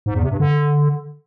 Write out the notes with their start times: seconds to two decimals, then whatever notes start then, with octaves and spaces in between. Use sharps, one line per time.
0.06 G#2
0.14 E2
0.23 C3
0.31 G2
0.40 D3